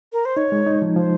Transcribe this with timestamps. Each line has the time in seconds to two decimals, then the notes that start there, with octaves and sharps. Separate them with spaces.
0.13 A#4
0.25 C5
0.37 D#4 C#5
0.52 G#3
0.66 D#4
0.82 F3
0.96 F3 C5